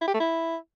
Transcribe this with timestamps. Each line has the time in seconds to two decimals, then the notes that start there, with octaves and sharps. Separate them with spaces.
0.02 E4
0.08 G4
0.14 A3
0.20 E4